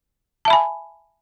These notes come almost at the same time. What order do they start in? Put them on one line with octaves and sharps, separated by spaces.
A5 E5 B5 G#5